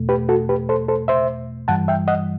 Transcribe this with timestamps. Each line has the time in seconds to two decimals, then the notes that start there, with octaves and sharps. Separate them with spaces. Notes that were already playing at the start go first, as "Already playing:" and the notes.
Already playing: E2 B2 A3
0.09 G4 B4
0.29 F#4 A4
0.49 G4 B4
0.69 A4 C5
0.88 A4 C5
1.08 C5 E5
1.68 G2 E3 G3 F#5 A5
1.88 E5 G5
2.08 D#5 F#5